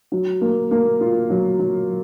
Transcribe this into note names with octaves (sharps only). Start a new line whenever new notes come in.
F#3
A#3
A#3
F4
F#3
F#3